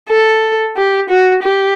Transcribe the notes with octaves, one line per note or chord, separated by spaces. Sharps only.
A4
G4
F#4
G4